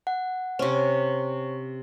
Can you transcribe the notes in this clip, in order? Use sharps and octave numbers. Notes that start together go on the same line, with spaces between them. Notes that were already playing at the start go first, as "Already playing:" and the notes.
F#5
C3 C#4 C5 C#5 C#6